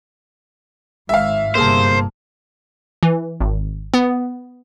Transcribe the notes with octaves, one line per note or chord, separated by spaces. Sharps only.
G#1 G#2 E5 F5
G1 C3 A#3 G#4 C5 A5
E3
G#1
B3